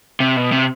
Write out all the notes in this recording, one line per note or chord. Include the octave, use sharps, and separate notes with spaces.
C3
B2
C3